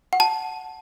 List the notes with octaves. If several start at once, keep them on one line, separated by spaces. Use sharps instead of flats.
F#5
A5